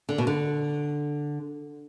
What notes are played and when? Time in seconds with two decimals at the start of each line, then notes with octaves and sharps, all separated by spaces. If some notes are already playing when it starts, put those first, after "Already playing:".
0.09 D3
0.18 B2
0.27 D3